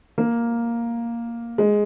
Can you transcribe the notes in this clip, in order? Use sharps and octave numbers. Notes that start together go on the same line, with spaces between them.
A#3
G#3